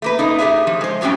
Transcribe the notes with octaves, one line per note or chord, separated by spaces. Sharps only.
A3 A#3 B4
A#3 D4 D#4
A3 G4 G#4 B4 E5
F3
G#3 C5
F2 A2 F#3 G3 C#4 G5